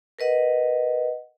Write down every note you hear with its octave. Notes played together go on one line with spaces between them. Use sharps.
A#4 B4 D#5 F#5